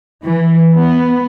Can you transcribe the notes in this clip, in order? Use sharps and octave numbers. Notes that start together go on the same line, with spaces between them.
E3
B3